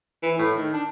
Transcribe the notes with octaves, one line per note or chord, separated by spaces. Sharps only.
E3
A2
D#3
D4